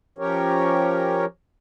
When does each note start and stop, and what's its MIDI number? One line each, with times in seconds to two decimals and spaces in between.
0.18 1.25 53
0.18 1.25 61
0.18 1.25 67
0.18 1.25 70
0.18 1.25 73